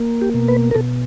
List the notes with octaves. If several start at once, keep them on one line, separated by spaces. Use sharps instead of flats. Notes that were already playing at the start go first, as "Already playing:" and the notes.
Already playing: A#3
G4
B2
B4
A#4
B2 A4